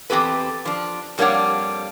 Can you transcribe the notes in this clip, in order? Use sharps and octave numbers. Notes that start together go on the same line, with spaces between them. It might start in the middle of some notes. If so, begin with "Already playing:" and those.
E2 C4 G4 A4 B4
F3 D4
F2 G3 A#3 D4 C#5 F#5